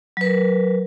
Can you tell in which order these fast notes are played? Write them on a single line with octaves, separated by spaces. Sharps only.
F#3 B4 A#4